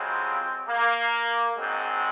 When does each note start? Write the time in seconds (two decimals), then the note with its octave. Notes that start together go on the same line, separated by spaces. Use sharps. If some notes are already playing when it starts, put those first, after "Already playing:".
Already playing: F2 C#3 F#3 G#3 C4
0.68 A#3
1.56 A#1 G#2 F#3 G#3 C4